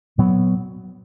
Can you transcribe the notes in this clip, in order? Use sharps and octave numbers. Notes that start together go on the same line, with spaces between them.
A#2 F#3 B3